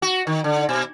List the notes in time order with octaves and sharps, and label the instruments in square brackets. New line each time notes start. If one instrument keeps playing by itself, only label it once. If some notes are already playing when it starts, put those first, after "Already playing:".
[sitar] F#4
D#3
D3
B2